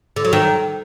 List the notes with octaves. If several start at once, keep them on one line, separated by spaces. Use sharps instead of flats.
D3
F#3
D#3